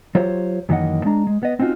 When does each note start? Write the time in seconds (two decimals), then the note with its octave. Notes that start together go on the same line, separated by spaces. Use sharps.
0.15 F#3 F4 G4 C5 C#5
0.69 F#2 D#3 E3 A#3 D#5 F#5
1.05 G#3 D4 A#5
1.27 G#3
1.43 B3 D#5
1.60 C4 C#4 D#4 F4 F#4